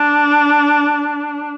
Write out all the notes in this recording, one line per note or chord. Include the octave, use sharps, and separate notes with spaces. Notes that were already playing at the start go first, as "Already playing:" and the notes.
Already playing: D4